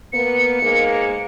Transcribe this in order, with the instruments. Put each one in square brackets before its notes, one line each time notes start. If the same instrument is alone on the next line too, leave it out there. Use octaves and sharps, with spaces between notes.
[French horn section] A#3 B3 [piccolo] C#7
[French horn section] G#2 G#3 A#3